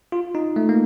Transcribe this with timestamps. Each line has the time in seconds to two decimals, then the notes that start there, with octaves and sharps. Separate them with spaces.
0.12 F4
0.35 D#4
0.56 A3
0.69 A#3